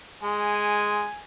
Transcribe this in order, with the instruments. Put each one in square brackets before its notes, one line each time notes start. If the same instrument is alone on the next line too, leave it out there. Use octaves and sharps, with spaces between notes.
[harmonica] G#3 [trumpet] G#5